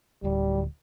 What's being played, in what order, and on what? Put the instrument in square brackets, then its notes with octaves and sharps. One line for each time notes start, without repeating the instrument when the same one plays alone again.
[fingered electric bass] D1 D2 [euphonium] G3